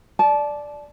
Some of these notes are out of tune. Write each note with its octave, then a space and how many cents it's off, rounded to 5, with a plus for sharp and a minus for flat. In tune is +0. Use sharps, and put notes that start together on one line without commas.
D5 +0 A5 -25